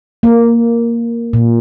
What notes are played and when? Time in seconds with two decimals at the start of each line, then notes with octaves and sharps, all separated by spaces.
0.23 A#3
1.33 A#2